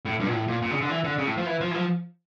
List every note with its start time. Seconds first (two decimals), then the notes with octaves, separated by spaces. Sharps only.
0.05 A2
0.20 G2
0.27 A#2
0.33 A2
0.48 A#2
0.62 A#2
0.71 C#3
0.81 D3
0.90 E3
1.04 D3
1.18 C#3
1.27 A2
1.37 F3
1.46 E3
1.61 F3
1.71 E3
1.74 F3